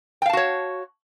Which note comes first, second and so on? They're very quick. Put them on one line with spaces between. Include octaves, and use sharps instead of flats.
G5 F5 A5 F#4 C#5